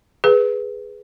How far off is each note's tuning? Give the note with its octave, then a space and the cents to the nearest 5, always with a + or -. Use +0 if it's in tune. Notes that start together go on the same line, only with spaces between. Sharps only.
G#4 +0 B4 +0